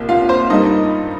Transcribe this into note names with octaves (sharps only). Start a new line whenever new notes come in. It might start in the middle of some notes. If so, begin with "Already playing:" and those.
Already playing: C2 A#2 A#3
F4 F5
C5
G2 G3 A#3 D#4 D#5